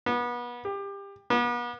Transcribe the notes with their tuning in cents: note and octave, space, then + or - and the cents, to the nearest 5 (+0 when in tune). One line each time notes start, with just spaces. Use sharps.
B3 -30
G4 +25
B3 -40